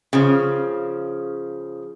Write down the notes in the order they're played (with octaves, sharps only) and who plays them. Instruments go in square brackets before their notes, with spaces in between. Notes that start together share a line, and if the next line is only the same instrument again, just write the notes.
[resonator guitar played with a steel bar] C#3 F3